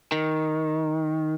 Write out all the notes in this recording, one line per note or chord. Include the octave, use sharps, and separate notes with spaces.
D#3